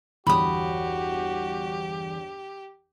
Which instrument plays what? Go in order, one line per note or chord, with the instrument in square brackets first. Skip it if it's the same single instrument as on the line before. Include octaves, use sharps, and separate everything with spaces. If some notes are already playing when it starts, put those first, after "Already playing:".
[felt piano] G1 E2 [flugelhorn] F#4 [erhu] G4 [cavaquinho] B5 D#6